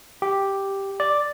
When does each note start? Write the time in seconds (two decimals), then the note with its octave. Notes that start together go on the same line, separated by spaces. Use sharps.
0.22 G4
1.00 D5